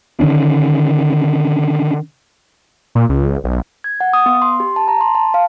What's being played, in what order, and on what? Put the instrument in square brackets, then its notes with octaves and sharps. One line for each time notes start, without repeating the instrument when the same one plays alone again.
[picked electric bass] D3 D#3 C#4 D4
[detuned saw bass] A#2
C#2
B1
[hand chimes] G#6
F#5
D#6
B3
C6
G4
A5
A#5
C6
A5
F5